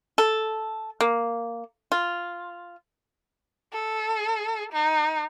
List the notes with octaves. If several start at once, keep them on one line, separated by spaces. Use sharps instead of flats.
A4
A#3
F4
A4
D#4